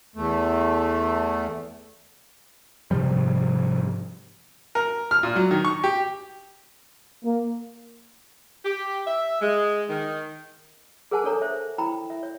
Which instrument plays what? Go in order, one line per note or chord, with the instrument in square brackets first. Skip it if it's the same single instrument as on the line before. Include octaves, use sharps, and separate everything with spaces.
[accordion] E2 A3
[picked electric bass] G#2 C3 F3 G3
[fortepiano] A#4
F6
A#2
F#3
D#3
C#6
G4
[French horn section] A#3
[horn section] G4
E5
G#3
D#3
[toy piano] G#4 A#4 C5 F#5 G#5 A5
D4 A4 C#5 A#5
C5 E5
E4 G5 A#5 B5
E5
C#5